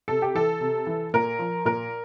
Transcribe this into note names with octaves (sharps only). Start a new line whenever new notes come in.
C3 A4
G4
E3 A4
C3
E3
A#2 A#4
F3
A#2 A#4